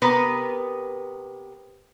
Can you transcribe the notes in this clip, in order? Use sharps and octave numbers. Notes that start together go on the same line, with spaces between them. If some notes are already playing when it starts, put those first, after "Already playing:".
C3 B3 A#4 B4